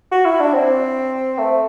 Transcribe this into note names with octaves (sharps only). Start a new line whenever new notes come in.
F#4
E4
D4
C4
A3